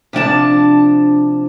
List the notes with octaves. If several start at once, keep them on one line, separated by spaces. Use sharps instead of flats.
C3 F3 D4 A5